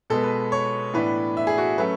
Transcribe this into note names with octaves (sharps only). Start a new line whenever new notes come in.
B2 G#3 B3 A4
B4
C#5
A2 E3 B3 D4 B4
E5
G#4
F#4
F#3 A3 C#4 B4